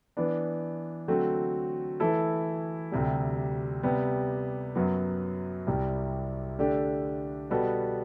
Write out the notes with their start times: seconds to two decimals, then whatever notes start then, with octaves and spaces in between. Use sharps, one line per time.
0.17 E3 B3 D4
1.08 D3 F#3 A3 C4 F#4
2.00 E3 A3 E4 A4
2.92 D2 C3 G3
3.83 C3 G3 B3
4.75 F#2 F#3 B3
5.67 C2 C3 G3
6.59 D3 A3 D4 G4
7.50 B2 G3 B3 F#4 A4